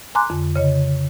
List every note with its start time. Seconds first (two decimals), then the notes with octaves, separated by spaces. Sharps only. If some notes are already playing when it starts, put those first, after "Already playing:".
0.15 G#5 A#5 C6 D6 F#6
0.30 F2 D3
0.56 C#3 C#5 D#5